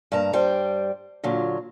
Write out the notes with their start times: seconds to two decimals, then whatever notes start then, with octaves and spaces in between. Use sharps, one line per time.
0.12 G2 A#3 A5 A#5
0.33 G2 G3 C5 G5
1.24 A#2 D3 F#3 F4